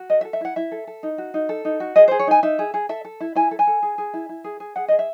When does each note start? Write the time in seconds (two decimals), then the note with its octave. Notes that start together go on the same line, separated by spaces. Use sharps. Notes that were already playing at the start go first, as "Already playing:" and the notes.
Already playing: F#4
0.10 A4 D#5
0.21 E5
0.25 A4
0.33 E5
0.41 E4 F#5
0.56 E4 E5
0.72 A4
0.87 A4
1.03 D#4
1.18 F#4
1.34 D#4
1.49 A4
1.65 D#4
1.80 F#4
1.96 G#4 D#5
2.08 C5
2.11 G#4
2.19 C#5
2.27 D#4 G#5
2.43 D#4 E5
2.59 G#4
2.74 G#4
2.89 A4 E5
3.05 A4
3.20 E4
3.35 E4 G#5
3.51 A4
3.59 G#5
3.67 A4
3.83 G#4
3.98 G#4
4.14 E4
4.29 E4
4.44 G#4
4.60 G#4
4.76 G#4 F#5
4.88 G#4 D#5
4.99 E5